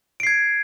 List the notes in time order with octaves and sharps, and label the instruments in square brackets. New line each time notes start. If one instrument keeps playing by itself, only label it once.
[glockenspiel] D7
C7
G#6